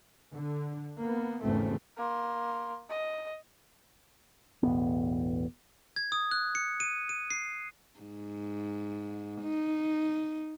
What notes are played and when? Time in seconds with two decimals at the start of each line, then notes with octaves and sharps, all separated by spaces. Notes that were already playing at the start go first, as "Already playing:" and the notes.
0.35 D3
1.02 A#3 B3
1.44 G#1 E2 C#3 A3 C4
1.97 A#3 C6
2.89 D#5
4.63 E1 A1 B3
5.96 G#6
6.12 D#6
6.31 F#6
6.55 C#7
6.80 D#7
7.09 D#7
7.30 C7
8.00 G#2
9.42 D#4